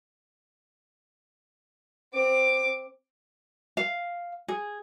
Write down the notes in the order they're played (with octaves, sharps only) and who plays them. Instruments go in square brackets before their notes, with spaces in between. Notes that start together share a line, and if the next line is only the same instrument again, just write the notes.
[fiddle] C4 D6
[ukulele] F5
G#4